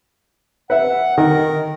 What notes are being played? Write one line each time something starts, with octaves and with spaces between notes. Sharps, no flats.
B4 E5 F#5
D#3 A#4